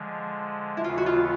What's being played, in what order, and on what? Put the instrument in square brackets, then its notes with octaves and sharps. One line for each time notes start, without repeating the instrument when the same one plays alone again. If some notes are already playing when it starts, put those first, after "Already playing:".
Already playing: [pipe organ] D3 F3 G#3
[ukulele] E4
[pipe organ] D#2 C#3 E3 G#3 B3 [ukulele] F4
[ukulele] F#4
F4